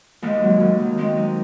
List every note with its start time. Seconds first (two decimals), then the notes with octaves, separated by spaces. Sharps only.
0.22 D#2 G#3
0.42 F#3
0.60 D#2
0.79 D#3
0.98 G#3 C4
1.17 D#4